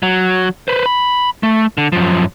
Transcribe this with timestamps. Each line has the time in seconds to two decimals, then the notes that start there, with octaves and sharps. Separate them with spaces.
0.03 F#3
0.68 B4 C5
0.86 B5
1.43 A3
1.78 D3
1.92 F#2 F3